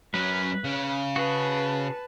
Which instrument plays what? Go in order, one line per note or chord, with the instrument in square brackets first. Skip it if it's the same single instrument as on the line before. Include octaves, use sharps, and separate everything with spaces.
[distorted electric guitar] F#3 C#4 [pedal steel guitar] B4
[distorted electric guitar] C#3
[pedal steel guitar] F#4 G#4 [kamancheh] B4 A5